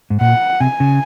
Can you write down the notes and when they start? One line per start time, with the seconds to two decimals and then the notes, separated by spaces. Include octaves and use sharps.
0.10 G#2
0.21 A#2 F#5
0.60 C3 G#5
0.80 C#3